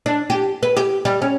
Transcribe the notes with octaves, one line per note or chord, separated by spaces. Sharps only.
D4
G4
B4
G4
G3
C#4